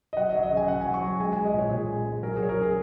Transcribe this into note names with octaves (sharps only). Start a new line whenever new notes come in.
D#5
F#3 F#5
D#5
F#3
D#5
C#3
G#5
C#3 F#5
F#3 G#5
C#6
F#3
G#3 G#5
G#5
G#3
D#5
A#2 C#5
A#2 G#4
G#3
G#3
F#3 A#4
G#4
F#3 C#5
A#4
C#3 G#4